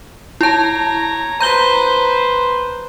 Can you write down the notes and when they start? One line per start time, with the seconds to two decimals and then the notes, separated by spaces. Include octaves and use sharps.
0.41 E4 C#5 A5 A#5
1.41 B4 C5 A#5 G6 G7